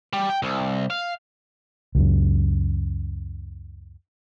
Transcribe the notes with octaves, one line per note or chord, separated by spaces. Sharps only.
G3
G5
C2
F5
C#2 F#2